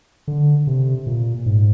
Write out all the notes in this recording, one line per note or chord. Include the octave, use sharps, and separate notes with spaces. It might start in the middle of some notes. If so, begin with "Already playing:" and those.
D3
C3
A#2
G#2